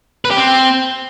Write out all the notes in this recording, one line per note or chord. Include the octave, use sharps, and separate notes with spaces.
B4
G4
C4